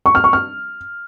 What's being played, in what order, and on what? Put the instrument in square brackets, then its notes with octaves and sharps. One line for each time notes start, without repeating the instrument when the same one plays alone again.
[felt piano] C#6
F6
C#6
F6